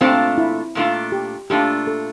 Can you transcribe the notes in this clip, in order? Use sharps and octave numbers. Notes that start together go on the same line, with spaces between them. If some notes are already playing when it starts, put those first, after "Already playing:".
A#2 A3 C4 D4 F4
E4
A#2 A3 D4 F4
G4
A#2 A3 D4 F4 G4
A4